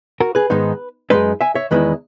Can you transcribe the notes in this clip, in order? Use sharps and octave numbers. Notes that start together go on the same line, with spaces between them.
F#4 A#4
G#4 B4
G#2 D#3 G#3 B3 D#4
F#2 C#3 G#3 D#4 B4 D#5
E5 G#5
C#5 E5
E2 D#3 G#3 B3 E4 B4 D#5